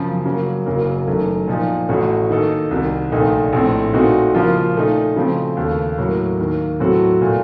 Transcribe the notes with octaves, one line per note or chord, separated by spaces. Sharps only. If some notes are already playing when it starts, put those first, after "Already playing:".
Already playing: F#2 C#3 F3
C#3 F#3 A#3
F#1 F#2 C#3 F#3 A#3
F#1 F#2 D#3 A3
A#2 F3 A#3 D#4
A1 A2 A3 C#4 F#4
D#3 A#3 D#4 A4
C2 C3 D#3
A#1 A#2 A3 D#4
A#1 A2 A3 C4
A#2 A3 C4 D#4 F#4
C#3 F3 A#3 F4
A#2 A3 D#4
C#3 F3 A3 C4
D#2 C#3 A3
A2 F#3 A#3
D#2 D#3 A#3
A2 F#3 C4 F#4 A4
A#2 A3